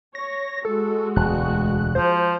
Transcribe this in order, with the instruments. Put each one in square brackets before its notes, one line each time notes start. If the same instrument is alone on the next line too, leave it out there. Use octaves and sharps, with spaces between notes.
[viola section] C#5 [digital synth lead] A#6
[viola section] G#3 F#4 [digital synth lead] A4
[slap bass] E1 D2 [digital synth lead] F#6
[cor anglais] F3 [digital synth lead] C5